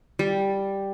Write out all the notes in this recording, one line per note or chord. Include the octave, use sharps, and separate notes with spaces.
G3